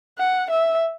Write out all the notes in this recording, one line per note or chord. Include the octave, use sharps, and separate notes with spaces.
F#5
E5